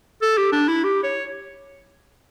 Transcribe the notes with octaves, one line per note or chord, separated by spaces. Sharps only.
A4
G4
D4
E4
G4
C#5